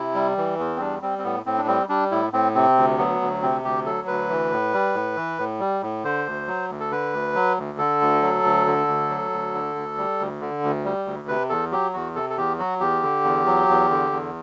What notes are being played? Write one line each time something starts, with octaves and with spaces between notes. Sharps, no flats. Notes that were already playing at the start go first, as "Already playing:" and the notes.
Already playing: C3 E4
G3
E3
E2
C4
G3 D4
G3 C4
C4
A2 B3
A2 C4
D4
G3 C4
G3 D4
A2 E4
A2 C4
C3 C4
D2
F#3 B3
D2
C3 C4
D2 G4
F#3 A4
D2 B4
E3
A2
G3
A2
E3
A2
G3
A2
D3 C5
D2
F#3
D2
A4
D3 B4
D2
F#3
D2
D3 A4
D2
F#3
D2
D3
D2
F#3
D2
D3
D2
G3
D2
D3
D2
G3
D2
C3 B4
E2 A4
F#3 G4
E2 F#4
C3 A4
A4
E2 G4
F#3 F#4
E2 G4
D3
E2
F#3
E2
D3
E2